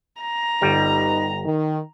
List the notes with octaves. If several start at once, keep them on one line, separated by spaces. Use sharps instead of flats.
A#5
G1 G3 D#4 B4
D#3